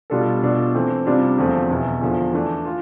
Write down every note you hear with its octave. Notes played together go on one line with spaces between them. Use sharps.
B2 G3 D4 F4 A4
B2 A3 D4 F4 A4
E3 A3 C4
C3 G3 D4 F4
E2 D3 F3 A3 C4
E2 B2 B3 E4
E2 D3 F3
E3 A3 D4
F4